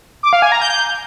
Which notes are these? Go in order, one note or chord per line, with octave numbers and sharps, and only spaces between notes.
D6
F5
G#5
A#5
G6